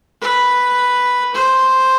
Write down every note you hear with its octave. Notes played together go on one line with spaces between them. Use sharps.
B4
C5